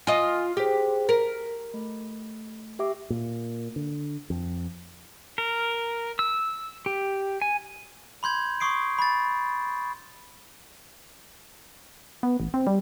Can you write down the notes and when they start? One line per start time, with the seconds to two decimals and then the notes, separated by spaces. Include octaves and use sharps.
0.07 F4 D#5 G#5
0.57 G4 G#4 C5
1.09 A#4 B6
1.74 A3
2.79 G4 E5 D6
3.10 A#2
3.76 D3
4.30 F2
5.38 A#4
6.19 E6
6.86 G4
7.42 G#5
8.23 B5 C6 G6 G#6
8.60 C6 C#6 D#6 C7 D7
8.99 B5 A6
12.23 B3
12.40 A1
12.54 C4
12.67 G3